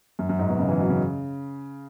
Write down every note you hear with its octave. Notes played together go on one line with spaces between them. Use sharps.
F#2
F#2
G#2
B2
C#3
E3
F#3
C#3